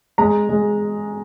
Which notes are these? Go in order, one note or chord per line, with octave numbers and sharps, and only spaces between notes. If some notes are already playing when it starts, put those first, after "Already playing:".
G#3 A#5
G#3